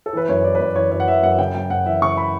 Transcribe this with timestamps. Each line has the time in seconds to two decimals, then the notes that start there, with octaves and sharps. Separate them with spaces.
0.06 A4
0.13 E3 B4
0.29 F#2 C#5
0.44 E3 D5
0.55 B4
0.60 F#2
0.66 C#5
0.76 E3 C#5
0.91 F#2 C#5
1.00 F#5
1.07 E3 E5
1.23 F#2 F#5
1.38 C#3 G5
1.55 F#2 G5
1.70 F#2 F#5
1.86 E3 E5
2.02 C#3 C#6
2.17 B5